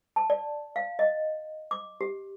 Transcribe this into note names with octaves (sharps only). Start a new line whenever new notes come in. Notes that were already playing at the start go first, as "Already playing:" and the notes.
A5
D5
F5
D#5
D6
G4